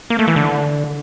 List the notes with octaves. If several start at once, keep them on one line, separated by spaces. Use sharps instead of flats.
A#3
A3
E3
D3